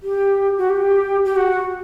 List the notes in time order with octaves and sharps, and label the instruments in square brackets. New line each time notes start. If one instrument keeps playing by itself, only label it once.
[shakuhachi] G4
F#4
G4
G4
F#4